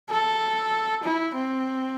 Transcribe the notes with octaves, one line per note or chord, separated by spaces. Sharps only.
A4
E4
C4